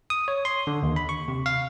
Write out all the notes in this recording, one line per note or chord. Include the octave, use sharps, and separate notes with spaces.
D#6
C#5
C6
D3
D#2
B5
C#6
C3
F5